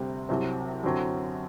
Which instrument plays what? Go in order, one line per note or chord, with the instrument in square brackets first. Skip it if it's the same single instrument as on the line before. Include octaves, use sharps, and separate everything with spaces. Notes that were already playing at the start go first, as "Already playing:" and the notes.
Already playing: [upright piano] D2 C3 G3 C4
C2 C3 F#3 C4
F#2 D3 F#3 C4